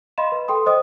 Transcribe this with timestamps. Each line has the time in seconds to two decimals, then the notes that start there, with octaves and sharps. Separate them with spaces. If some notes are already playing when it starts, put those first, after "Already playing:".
0.18 D#5 F5 B5 C6 E7
0.32 B4
0.48 A4 G5 C6 D#6
0.66 C5 D#5 D#6